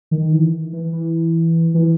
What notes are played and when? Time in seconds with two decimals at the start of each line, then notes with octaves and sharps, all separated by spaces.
0.11 D#3
0.32 E3
0.73 E3
0.92 E3
1.74 E3